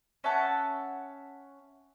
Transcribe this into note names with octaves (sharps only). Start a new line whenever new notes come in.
C#4 E5 F#5 A5